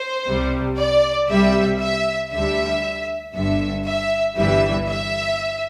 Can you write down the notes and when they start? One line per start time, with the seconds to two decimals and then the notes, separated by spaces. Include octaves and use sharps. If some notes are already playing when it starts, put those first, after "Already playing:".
Already playing: C5
0.26 C2 C3 G3
0.77 D5
1.29 C2 C3 G3 E5
1.79 E5
2.31 D2 D3 G3 E5
3.34 G1 G2 D3 E5
3.85 E5
4.36 G1 G2 E3 G3 E5
4.88 E5